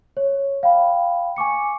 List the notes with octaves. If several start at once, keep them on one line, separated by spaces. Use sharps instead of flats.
C#5
F5 G5 B5
G#5 C#6 D6 C#7